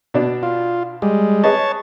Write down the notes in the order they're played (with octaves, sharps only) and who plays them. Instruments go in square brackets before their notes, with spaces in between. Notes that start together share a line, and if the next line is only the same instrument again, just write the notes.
[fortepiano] B2 D4
[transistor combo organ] F4
G3 G#3
[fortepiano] G#4 B4 D#5 [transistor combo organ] C#5 A5